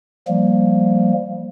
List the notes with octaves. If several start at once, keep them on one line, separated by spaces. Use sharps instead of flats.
F3 G3 A#3